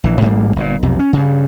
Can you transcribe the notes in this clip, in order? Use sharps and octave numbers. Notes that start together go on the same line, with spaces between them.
A#1 E3
A1 G#2 G3 A#3
G1 A#2
B1 F2 C3
C#4
G2 C#3